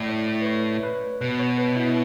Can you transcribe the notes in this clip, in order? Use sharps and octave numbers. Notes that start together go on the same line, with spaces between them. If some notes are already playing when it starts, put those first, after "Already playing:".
Already playing: A2 D5
C#5
C#5
B4
C#5
B4
B2 B4
C#5
B4
E4